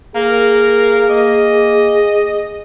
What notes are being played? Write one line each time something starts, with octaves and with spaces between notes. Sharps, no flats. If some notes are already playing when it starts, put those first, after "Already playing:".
A#3 G#4 A#4
A#3 D#5